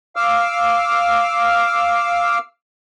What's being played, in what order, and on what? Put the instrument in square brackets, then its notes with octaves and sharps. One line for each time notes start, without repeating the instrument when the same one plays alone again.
[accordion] F5 D6 E6 F6